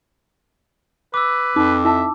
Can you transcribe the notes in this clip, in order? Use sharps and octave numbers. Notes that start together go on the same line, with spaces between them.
B4 D6 E6
F2 D#4 D6
E4 E5 A5